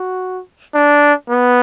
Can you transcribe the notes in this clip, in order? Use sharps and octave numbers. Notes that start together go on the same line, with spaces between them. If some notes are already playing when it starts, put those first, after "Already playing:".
Already playing: F#4
D4
B3